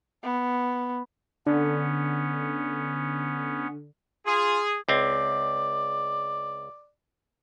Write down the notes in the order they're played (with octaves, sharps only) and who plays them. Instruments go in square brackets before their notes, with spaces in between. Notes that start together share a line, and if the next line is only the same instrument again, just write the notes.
[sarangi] B3
[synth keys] D3 [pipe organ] B3 C#4
[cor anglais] F4 [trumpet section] G#4
[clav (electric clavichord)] C#2 C4 [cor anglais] D5